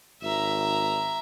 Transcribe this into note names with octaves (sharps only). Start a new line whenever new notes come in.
G#1 E5 A#5